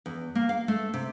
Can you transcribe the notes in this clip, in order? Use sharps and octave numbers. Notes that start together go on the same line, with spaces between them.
E2
A#3
F5
A3
C3